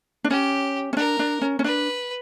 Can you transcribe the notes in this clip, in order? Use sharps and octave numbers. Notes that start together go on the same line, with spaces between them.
D4
C#4 G4
C#4
D4 A#4
D4
C#4
C#4
D4 B4